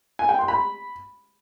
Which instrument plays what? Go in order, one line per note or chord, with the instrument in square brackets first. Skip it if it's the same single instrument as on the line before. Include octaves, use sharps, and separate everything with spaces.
[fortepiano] G#5
G5
C6
B5